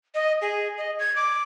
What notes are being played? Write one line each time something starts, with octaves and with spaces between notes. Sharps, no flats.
D#5
G#4
D#5
G#6
D6